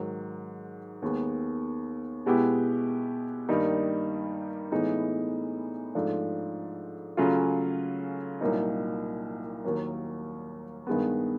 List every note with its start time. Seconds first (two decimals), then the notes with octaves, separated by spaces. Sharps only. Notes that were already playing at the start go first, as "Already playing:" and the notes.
Already playing: G#2 D#3 F#3
1.02 D#2 D#3 G#3 B3
2.26 B2 G#3 B3 E4 G4
3.49 G2 D#3 G3 A#3 D#4
4.72 A2 E3 G#3 B3 D#4
5.95 G#2 F3 A3 D4
7.17 C#3 F#3 A3 C#4 F4
8.41 C2 A#2 F#3 A#3 D#4
9.64 D#2 D#3 F#3 A#3
10.87 G2 D#3 G#3 B3